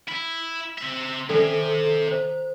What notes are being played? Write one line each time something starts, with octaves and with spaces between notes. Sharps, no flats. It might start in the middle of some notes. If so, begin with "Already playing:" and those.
E4
C4 E5
C3 D#3 A4
C5